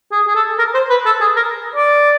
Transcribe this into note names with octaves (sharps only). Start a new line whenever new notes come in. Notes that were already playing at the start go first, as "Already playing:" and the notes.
G#4
G#4
A4
A#4
C5
B4
A4
G#4
A#4
D5